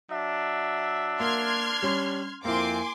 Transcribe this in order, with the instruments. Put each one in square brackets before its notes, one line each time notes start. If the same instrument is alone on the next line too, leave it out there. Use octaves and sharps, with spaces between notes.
[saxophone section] F#3 E5 [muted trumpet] D4
[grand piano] A#3 [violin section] C6 F6 G#6
[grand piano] G3 C#4
[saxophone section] F2 [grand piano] A#3 E4 [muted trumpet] C4 [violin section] G#5 C6 D6